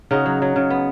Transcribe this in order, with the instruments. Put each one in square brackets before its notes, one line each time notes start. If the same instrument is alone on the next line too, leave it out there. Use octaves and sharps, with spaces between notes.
[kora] C#3 D#4 F#4
F#3
F#3
C#3
B3